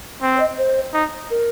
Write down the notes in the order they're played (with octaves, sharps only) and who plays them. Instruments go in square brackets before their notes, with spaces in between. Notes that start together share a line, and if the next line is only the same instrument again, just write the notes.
[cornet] C4
[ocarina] C5
D#5
C5
[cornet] D#4
[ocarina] A#4